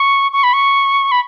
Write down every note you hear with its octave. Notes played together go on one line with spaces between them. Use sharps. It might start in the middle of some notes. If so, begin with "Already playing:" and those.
Already playing: C#6
C#6
B5
C#6
B5